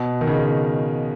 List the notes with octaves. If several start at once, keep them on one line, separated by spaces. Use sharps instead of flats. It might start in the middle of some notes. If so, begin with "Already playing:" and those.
Already playing: B2
D#3
C#3